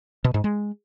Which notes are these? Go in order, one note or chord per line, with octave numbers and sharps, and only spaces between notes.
B2
G#2
G#3